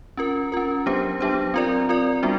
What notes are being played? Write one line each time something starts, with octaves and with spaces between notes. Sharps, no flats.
C#4 F4 A#4
C#4 F4 A#4
F#3 B3 D4 G4 C5
F#3 B3 D4 G4 C5
C4 F4 A#4 D5
C4 F4 A#4 D5
G3 B3 D4 F#4